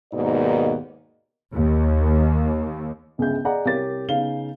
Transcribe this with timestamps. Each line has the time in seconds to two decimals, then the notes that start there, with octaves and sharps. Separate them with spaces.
0.12 D#2 G#2 B2 A#3 D#4 D5
1.55 D#2
3.18 G1 C#2 G#4 E5 G6
3.45 G#4 D5 D#5 F#5 A#5
3.65 C2 G4 A#4 C#5 A6
4.09 C#3 B3 C#4 D#4 F5 G7